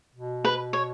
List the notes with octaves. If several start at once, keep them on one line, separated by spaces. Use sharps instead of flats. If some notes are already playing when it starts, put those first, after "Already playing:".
B2
B4
C#5